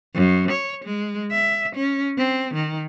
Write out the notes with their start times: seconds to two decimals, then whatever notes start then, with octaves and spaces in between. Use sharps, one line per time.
0.14 F#2
0.52 C#5
0.85 G#3
1.32 E5
1.76 C#4
2.18 C4
2.55 D#3